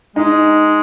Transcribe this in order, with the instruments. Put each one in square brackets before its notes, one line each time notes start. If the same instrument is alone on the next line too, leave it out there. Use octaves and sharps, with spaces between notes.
[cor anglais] G#3 [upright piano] D#4